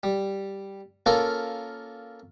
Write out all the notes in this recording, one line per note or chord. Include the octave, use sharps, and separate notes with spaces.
G3
A#3 C#4 F4 A4 A#4